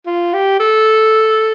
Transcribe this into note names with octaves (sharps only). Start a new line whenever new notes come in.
F4
G4
A4